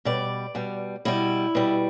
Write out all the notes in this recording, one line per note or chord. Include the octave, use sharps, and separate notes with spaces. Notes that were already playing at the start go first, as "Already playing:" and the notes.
B2 G3 D5
B2 G3
B2 G3 E4
B2 G3